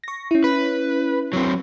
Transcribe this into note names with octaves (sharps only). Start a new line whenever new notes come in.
C#6 A#6
C#4 E4
B4
F#3 C4